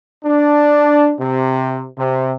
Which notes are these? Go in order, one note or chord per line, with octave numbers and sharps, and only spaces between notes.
D4
C3
C3